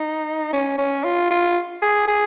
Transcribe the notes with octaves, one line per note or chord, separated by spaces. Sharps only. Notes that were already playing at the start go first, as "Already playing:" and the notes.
Already playing: D#4
C#4
C#4
F4
F4
G#4
G#4